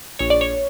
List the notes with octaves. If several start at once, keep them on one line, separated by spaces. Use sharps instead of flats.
A#1 C#5
D5
C#5